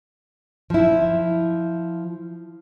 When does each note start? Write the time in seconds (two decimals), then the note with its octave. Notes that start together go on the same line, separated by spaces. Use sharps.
0.70 F3 E4